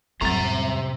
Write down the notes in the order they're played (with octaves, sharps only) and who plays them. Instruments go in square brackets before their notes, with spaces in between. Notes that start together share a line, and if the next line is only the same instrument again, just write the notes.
[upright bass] F2 G3 [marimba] A2 F#3 [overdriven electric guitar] C3 A#5